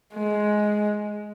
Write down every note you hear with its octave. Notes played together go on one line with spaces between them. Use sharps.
G#3